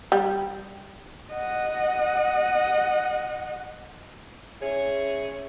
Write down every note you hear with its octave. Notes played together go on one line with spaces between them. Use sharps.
G3
D#5 F#5
C#4 E4 G#4 C#5